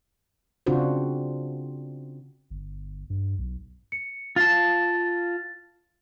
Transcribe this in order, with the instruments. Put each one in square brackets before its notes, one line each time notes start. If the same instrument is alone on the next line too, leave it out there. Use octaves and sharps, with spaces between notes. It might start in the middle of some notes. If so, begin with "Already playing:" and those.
[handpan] C#3 C4 D4 F4 F#4 C5
[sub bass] G1
G2
B1
[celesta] C#7
[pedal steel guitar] F4 F5 A5 [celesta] A6